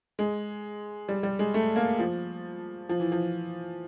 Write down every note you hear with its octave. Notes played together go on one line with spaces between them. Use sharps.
G#3
G3
G3
G#3
A3
A#3
F3
F3
E3
F3